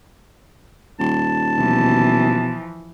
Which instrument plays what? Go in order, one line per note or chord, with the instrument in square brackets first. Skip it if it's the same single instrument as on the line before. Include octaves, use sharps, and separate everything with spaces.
[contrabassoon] D#1 [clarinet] A5
[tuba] B2 [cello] E3 F3